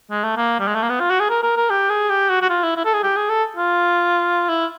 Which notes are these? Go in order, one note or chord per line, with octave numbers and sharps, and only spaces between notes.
G#3
A3
A#3
G3
G#3
A3
A#3
B3
F4
F#4
G#4
A#4
A#4
A#4
G4
G#4
G4
F#4
F#4
F4
E4
E4
A4
G#4
G4
G#4
A4
F4
E4